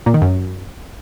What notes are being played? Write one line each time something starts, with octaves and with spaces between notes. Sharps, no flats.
A#2
D#3
F#2